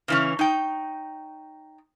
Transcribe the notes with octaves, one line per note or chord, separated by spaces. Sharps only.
C#3 E3 C#4
D#4 G5